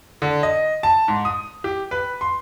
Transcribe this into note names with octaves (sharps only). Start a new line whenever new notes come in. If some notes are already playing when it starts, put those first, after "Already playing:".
D3
D#5
A5
G#2
D#6
G4
B4
C6